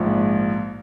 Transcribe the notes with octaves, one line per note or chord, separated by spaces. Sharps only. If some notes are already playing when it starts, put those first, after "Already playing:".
Already playing: A#1 G#2 F3